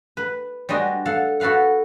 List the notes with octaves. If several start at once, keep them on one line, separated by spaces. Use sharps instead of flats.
B4
G3 G#3 D4 F#4 D#5
A4 F5 F#5
F#4 A4 B4 F5 F#5